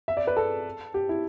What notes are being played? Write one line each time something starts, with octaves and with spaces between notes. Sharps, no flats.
E5
D5
B4
A4
G4
E4